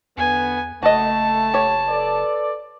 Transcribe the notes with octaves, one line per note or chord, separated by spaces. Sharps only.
E2 D3 B3 G#5
F#1 A3 F#4 D#5 A5
G4 C#5
A4 B4 D5